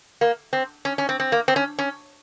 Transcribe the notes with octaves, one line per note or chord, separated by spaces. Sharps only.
A#3
C4
C#4
C#4
C4
C4
A#3
C4
C#4
C#4